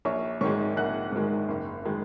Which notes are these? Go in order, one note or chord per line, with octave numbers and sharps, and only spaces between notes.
A#1 C#5 C#6
G#2 D#3 G#3 C#5 C#6
A#1 F#5 F#6
G#2 D#3 G#3
F#1
D#3 G#3